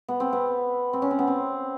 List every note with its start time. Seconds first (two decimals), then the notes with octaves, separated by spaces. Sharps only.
0.08 B3
0.20 C4
0.33 B3
0.93 C4
1.02 C#4
1.11 C4
1.19 B3
1.27 C4